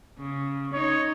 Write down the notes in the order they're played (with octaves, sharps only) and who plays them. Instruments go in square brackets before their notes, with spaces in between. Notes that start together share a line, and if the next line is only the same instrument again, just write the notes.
[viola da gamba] C#3
[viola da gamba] D#4 [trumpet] C#5